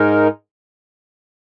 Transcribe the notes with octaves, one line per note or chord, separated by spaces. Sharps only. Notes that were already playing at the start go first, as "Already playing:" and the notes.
Already playing: G#2 G#3 D#4 A#4